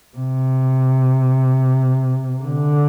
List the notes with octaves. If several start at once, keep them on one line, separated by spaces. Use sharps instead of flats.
C3
D3